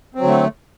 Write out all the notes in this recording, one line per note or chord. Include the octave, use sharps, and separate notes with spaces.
D3 F#3 A3 C4